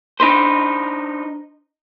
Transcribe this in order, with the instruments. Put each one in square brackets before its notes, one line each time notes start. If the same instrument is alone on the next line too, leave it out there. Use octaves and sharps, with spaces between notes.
[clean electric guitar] D4 D#4 B4 C5